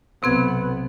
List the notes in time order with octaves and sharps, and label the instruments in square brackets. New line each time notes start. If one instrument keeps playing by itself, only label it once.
[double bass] B1 B3 [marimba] C3 C4 G#6